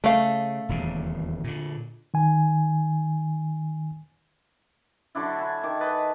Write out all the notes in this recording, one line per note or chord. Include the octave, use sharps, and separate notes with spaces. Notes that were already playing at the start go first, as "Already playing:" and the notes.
C#3 A3 F5
D#1 E2 C#3
A#2 D3
D#3 G#5
D3 F#3 D4 E4
E4 G#5
D#3 D6
B4 D#5 A5